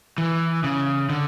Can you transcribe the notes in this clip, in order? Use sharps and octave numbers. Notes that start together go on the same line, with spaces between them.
E3
C#3
D3